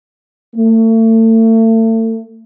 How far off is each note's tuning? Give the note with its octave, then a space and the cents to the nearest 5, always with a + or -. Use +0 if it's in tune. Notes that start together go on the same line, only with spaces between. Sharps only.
A3 +35